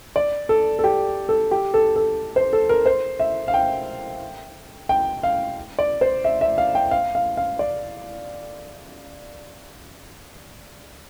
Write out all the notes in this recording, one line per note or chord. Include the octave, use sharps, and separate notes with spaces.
D5
A4
A4
G4
A4
G4
A4
A4
C5
A4
A#4
C5
E5
F5
G5
G5
F5
D5
C5
E5
E5
F5
G5
F5
F5
F5
D5